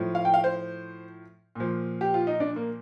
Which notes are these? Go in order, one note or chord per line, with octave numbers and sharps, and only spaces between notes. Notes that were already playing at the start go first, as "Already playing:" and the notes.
Already playing: A2 F3
F5
G5
F5
C5
A#2 F3
G4
F4
D#4
D4
A#3